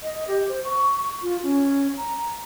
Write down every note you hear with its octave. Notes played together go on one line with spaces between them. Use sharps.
D#5
G4
C5
C#6
F4
C#4
A#5